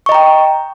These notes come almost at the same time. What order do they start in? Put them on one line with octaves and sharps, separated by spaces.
C#6 D#5 A#5 G5